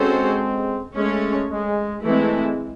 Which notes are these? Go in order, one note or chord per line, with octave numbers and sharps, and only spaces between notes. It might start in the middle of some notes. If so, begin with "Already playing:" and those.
Already playing: G#3 C4 C#4 F#4 A4 C5
G#3 A3 C#4 G#4 C#5
G#3
E3 G#3 A3 C4 E4